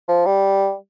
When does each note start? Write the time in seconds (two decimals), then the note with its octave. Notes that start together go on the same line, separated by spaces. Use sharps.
0.08 F3
0.26 G3